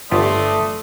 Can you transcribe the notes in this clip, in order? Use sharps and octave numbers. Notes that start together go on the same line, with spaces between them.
G1 A3 F4 G4 D5 C6 D#6